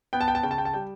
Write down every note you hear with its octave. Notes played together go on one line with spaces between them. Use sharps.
B3 G5
A5
G5
A5
C#3 G5
A5
G5
A5
G3 G5